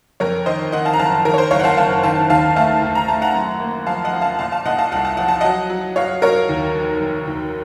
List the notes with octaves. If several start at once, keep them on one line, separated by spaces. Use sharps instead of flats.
F2 A#4 C#5
D#3 C5 D#5
D#3 D#5 F#5
F5 A5
A#5
F#1 F5 A5
D#3 A#4
C#5
C5
F#1 C#5 F5
F#5
F5 A5
F#1 F5 A5
D#3 F5 A5
D#2 F5 A5
A3 F5 A5
D#2
A#5
A3 A5
F#5 A#5
F#2
A#3
F3 F5 A5
D#5 F#5
F3
F5 A5
A#2 F5 A5
F5 A5
A#2 D#5 F#5
F5 A5
C2 F#5
A5
F3 F#5
A5
F#3 D#5 F#5
F#3
F#3 C#5 F5
F#3 A#4 C#5
D#2
F1
F1
D#2